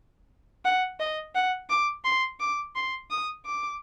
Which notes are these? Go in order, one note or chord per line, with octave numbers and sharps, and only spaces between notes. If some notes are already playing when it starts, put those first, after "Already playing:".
F#5
D#5
F#5
D6
C6
D6
C6
D#6
D6